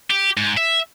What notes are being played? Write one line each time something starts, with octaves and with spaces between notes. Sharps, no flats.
G4
G#2
E5